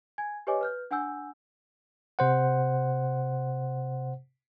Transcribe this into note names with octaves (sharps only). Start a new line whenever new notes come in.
G#5 G#6
G4 B4 C#5 D#5 G#5 D6
B4 F6 G6
D4 F#5 G#5 E6 G6
C3 C5 F#5